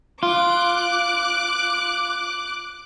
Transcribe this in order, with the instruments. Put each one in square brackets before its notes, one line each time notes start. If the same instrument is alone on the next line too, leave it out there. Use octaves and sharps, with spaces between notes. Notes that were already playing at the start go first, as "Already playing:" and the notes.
[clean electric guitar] F4 [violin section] D6 F#6